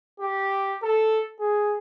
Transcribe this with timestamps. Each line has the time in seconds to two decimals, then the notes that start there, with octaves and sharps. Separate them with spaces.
0.20 G4
0.83 A4
1.40 G#4